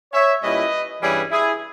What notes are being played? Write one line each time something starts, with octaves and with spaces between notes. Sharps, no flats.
C#5 E5
A#2 G3 C#4 E4 B4 D#5
G2 E3 G3 C#4 E4 G#4 B4
E4 G#4